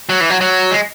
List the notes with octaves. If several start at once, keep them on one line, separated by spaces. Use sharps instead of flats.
F#3
E3
F#3
F#3
G#3